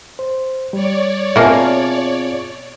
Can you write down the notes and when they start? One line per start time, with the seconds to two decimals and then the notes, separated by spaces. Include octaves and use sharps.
0.19 C5
0.73 G3 C#5 D5
1.36 B2 A#3 C4 F4 G#4 E5 G#5 A5